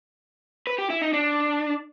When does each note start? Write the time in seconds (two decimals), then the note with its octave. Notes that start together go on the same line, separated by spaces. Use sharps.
0.67 B4
0.78 G4
0.90 E4
1.02 D#4
1.13 D4